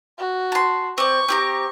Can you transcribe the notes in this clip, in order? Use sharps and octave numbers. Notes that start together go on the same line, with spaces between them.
F#4
A5 C6
C4 D5 C#6
C4 G4 A#5